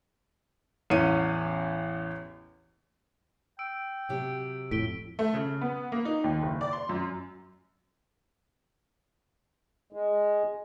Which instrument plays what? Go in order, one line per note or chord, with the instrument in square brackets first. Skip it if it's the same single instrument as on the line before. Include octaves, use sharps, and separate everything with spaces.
[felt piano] A1 E2 C#4 C#7 D#7
[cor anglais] G5 [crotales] E6 D7
[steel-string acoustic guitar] C3 F#3 G4
[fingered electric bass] F2 A2 [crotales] B6 D7 G7
[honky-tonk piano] A3
C#3
B3
A#3
D#4
D#2
F#1
D5
C6
F#2
[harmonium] G#3